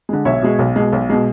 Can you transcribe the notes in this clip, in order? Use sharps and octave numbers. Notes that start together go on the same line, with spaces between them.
D3 G#3
B1 C#5 E5
B2 G#3
B1
B2 G#3
B1
B2 G#3